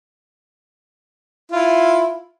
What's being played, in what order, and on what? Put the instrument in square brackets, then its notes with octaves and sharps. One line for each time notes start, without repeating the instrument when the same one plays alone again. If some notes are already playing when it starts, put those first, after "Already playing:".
[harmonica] E4 F4